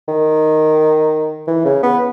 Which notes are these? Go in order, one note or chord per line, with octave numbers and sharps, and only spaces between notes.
D#3
E3
C#3
B3